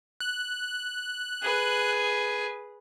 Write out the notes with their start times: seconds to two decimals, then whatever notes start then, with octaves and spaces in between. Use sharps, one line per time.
0.20 F#6
1.43 G#4 B4